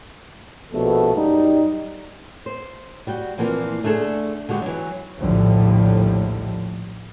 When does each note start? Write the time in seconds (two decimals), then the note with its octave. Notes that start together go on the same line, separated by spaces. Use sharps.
0.72 A#1 B2 A3 B3 A4
1.15 F#2 G3 D#4
2.46 C5
3.07 G3 F#4 G5
3.38 A#2 E3 F3 A#3 C4
3.83 D3 A3 D4 G#4 A4
4.49 D3 G#3 F#4 G4
4.62 E3 F#3
5.20 A#1 D#2 A2 D3 F3 G3